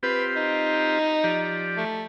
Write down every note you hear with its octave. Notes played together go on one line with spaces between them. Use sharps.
C4 F4 G4 B4
D#4
F3 G4 D5
A3